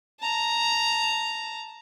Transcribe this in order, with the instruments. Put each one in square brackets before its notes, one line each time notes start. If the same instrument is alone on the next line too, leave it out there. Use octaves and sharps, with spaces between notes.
[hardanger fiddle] A5 A#5